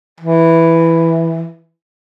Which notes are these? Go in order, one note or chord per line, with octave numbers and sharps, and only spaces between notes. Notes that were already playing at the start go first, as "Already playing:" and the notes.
E3